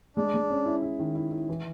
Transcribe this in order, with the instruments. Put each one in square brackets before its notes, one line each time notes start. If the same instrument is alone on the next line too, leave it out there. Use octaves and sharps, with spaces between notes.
[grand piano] G#3 [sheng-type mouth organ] D4
[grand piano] G#3
C#4
E4
E4
D#3
E4
E4
E3